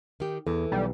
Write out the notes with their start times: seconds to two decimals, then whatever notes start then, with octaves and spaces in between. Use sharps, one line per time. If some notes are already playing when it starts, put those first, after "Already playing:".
0.20 D#3 G4
0.47 E2 E3 A4
0.72 B1 G3